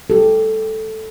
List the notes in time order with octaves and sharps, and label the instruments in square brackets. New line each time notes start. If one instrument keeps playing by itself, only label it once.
[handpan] G4 A4